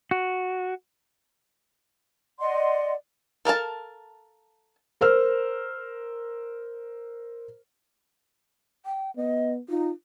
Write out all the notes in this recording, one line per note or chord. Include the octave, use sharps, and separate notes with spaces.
F#4
D5 D#5 F#5 C6
A4 A#4 F5 A5
A#4 C5 E6 F6
G5
B3 D#5
D#4 F4